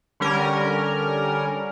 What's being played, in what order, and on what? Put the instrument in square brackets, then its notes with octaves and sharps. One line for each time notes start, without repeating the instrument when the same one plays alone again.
[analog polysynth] D3 G3 C#4 A#4